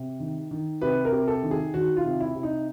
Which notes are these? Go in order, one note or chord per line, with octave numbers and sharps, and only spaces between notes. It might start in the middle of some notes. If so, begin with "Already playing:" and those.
Already playing: C3
D#3
D#3
C3 B4
A#4
C3
A4
D#3
G#4
D#3 F#4
F4
C3
E4
C3
D#4